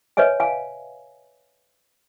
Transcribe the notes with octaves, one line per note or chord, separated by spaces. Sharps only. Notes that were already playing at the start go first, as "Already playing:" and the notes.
B4 C#5 D#5 E5 G#5
F5 G#5